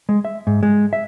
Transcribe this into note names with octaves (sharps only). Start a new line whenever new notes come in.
G#3
E5
G#2
G#3
E5